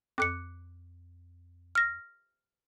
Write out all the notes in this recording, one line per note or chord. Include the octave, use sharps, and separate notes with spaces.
F2 D6 F#6 C#7
F6 A#6